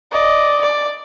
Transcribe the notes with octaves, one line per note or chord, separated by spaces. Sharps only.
D5 D#5
D5